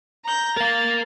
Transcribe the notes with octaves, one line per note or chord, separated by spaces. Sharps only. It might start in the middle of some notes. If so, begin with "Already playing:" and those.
A#5 G6
A#4 F5 A6